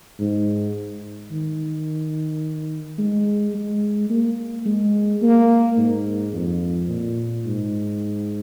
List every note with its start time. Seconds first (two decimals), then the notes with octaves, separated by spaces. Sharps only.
0.19 G#2
1.31 D#3
2.98 G#3
3.54 G#3
4.10 A#3
4.66 G#3
5.22 A#3
5.78 G#2
6.33 F2
6.89 A#2
7.46 G#2